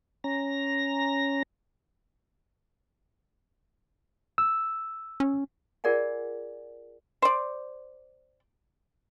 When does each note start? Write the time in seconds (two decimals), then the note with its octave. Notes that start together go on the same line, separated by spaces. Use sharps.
0.24 C#4 A#5 A#6
4.38 E6
5.20 C#4
5.84 F4 G#4 A#4 D5 F#5 G#5
7.22 C5 D5